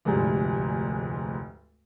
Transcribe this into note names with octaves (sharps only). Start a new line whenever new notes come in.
F1 D2 G#2 G3 A3